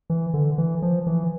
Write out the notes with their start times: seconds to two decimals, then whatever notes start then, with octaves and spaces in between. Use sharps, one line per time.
0.10 E3
0.34 D3
0.58 E3
0.82 F3
1.07 E3